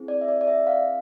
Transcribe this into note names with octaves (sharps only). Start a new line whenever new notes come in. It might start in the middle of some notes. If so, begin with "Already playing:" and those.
Already playing: C4 E4 G#4
D5
E5
D5
D5
E5
F5